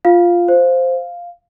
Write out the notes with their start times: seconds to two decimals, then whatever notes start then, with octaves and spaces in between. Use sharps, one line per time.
0.05 F4 F5
0.48 C5